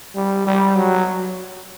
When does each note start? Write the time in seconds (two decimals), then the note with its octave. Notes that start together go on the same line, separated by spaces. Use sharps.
0.16 G3
0.47 G3
0.77 F#3